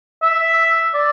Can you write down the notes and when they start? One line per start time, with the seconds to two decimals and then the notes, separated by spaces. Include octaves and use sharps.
0.23 E5
0.94 D5